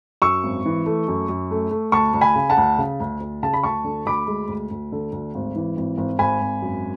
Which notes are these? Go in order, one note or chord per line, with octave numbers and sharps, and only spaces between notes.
F#2 C#6 E6
G#1
E3
A3
F#2
F#2
A3
A3
D2 A5 C#6
D2
G#5 B5
C#3
F#5 A5
D2
C#3
D2
D2
C#3 A5
B5
D2 A5 C#6
D3
D2 B5 D6
G#3
D2
D2
D3
D2
G#1
E3
G#1
G#1
G#1 G#5 B5
G#1
F#2